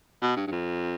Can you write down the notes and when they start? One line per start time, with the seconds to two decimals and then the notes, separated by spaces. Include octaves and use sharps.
0.22 B2
0.36 G2
0.47 G2
0.51 F2